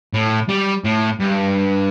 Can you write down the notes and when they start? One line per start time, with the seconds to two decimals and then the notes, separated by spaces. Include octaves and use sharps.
0.14 A2
0.49 G3
0.85 A2
1.20 G2